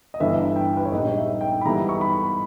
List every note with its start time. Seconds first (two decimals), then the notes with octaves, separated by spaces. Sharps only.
0.14 D#5
0.20 G1 G2 E3 E5
0.56 G5
0.77 B4
0.85 C#5
0.92 A#1 G#2 G3 B3 D#4 D#5
1.17 E5
1.41 G5
1.61 B5
1.65 G#2 E3 G3 B3 E4 A#5
1.89 C#6
2.01 B5